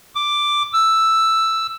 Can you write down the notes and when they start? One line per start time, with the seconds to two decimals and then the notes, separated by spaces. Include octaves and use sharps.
0.15 D6
0.73 E6